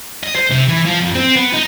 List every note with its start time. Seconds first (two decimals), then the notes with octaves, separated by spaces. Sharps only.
0.24 D#5
0.36 C5
0.51 C3
0.68 E3
0.85 F3
1.00 F2
1.14 C4
1.36 B3
1.53 D#4